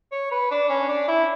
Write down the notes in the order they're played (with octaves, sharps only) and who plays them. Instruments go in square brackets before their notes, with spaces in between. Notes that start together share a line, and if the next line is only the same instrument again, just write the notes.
[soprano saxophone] C#5
B4
D4
C#4
D4
E4